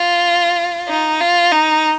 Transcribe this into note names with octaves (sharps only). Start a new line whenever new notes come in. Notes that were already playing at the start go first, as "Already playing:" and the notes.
Already playing: F4
D#4
F4
D#4